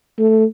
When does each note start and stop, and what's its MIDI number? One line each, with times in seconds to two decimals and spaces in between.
0.19 0.45 57